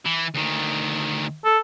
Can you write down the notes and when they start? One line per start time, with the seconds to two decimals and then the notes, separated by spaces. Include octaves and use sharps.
0.05 E3
0.34 D2 D#3
1.45 A4